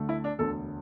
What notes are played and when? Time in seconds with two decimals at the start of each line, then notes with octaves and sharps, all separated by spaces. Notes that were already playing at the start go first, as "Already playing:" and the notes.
Already playing: D2 D3 A3
0.09 E4
0.24 D4
0.38 E1 D2 D3 A4